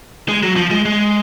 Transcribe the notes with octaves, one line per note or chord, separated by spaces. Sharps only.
G#3
F#3
F3
G#3
G#3